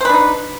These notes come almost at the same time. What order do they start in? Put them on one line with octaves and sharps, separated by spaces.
C5 B4 D4 D#4